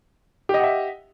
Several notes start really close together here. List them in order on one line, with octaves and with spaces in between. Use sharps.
G4 D#5 F#5 E5